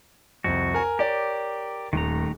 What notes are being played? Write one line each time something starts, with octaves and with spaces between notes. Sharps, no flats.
C2 F2 F#4
A#4 G#5
G4 A#4 C#5 D5
D#1 D#3 A3 A#5